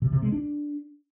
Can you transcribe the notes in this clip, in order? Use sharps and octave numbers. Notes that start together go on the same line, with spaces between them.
C3
C3
G#3
D4